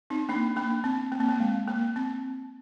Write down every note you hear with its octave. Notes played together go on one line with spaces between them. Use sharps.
C4 D#4
A#3 D4
A#3 D4
C4
A#3
C4
A#3
G#3
A#3
C4